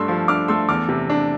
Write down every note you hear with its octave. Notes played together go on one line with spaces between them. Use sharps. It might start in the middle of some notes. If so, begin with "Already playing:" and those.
Already playing: G2 A3 D4 C6 E6
F3
D4 D6 F6
A3 C6 E6
E2 D6 F6
C3
D4